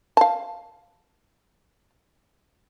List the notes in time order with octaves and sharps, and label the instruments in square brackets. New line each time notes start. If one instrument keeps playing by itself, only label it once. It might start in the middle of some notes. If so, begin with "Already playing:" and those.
[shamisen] F5 A5